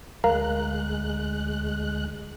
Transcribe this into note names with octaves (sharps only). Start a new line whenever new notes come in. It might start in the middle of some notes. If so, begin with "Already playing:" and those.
D2 G#3 A#4 F5 A#5 F#6